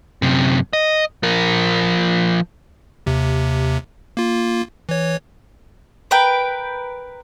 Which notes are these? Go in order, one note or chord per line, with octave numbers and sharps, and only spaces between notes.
F#2 C3
D#5
F3 A#4
D#2 C3
A#3 F4
E3 C#5
A#4 B4 G5